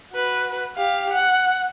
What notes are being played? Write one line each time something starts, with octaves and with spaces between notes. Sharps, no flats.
F#4 B4
G4 F5
F#5